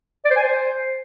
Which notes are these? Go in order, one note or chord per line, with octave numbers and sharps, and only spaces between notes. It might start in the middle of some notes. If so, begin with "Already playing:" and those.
D5
C5
G#5
C5